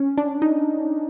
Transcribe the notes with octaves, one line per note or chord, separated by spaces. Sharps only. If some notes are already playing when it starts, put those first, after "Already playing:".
Already playing: C#4
D4
D#4